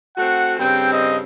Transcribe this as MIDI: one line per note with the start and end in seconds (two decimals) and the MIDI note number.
0.17 0.55 57
0.17 0.55 60
0.17 0.55 66
0.17 0.54 78
0.59 1.24 43
0.59 1.24 49
0.59 1.24 60
0.59 0.92 79
0.92 1.17 75